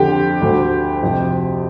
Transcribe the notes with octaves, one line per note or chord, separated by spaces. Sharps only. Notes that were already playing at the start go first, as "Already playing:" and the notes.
Already playing: F2 D3 G4
D2 D3
F2 C3